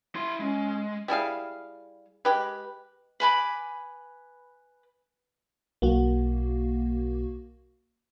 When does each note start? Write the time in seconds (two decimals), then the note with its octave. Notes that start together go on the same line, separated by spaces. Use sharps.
0.15 E4 C6
0.40 G#3 C#4
1.08 G3 E4 G#4 F5
2.25 G#3 G4 B4
3.20 B4 G#5 B5 D6
5.82 B1 A#3 F#4